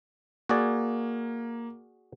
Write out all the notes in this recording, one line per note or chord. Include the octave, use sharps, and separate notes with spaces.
A#3 F#4 G#4 D5